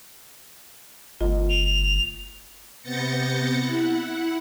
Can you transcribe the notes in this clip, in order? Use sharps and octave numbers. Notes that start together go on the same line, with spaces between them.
G1 A3 F4 D#5
F7
C3 B3 G6 A6 A#6 C#7
E4 F#5